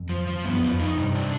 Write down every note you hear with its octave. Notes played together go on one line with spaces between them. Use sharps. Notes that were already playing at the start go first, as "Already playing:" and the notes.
Already playing: F2
F3
F3
G2 B3
F2
F3
F2
D#4
G2 C3
D4